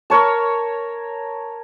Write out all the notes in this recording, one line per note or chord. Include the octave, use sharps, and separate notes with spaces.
A#4 C#5 A5